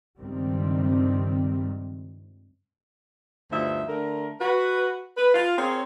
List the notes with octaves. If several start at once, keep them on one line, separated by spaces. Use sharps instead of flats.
C#2 G2 C3 D#3 G3 C4
D2 G2 F3 D#4 E5
D3 A3 A#4
F#4 B4
B4
F4 F5
C4 G#4 A#4 C#5